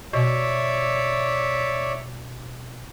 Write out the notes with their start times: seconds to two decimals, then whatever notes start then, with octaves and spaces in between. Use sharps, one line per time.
0.13 B2 C#5 D5 E5